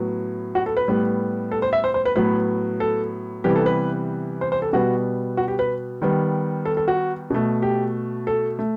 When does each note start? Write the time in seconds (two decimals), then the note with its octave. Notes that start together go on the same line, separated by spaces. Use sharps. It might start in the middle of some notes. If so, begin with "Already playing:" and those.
Already playing: A2 F#3 B3
0.55 F#4
0.66 A4
0.77 B4
0.88 A2 G3 B3
1.52 A4
1.62 C5
1.73 E5
1.84 C5
1.94 C5
2.05 B4
2.16 A2 F#3 B3 B4
2.80 A4
3.44 C3 E3 G3 B3 G4
3.56 A4
3.66 B4
4.41 C5
4.52 C5
4.62 A4
4.73 B2 G3 B3 F#4
5.37 F#4
5.48 G4
5.59 B4
6.02 D#3 G3 B3
6.65 A4
6.77 A4
6.88 F#4
7.30 B2 A3
7.62 G4
8.27 A4
8.59 A3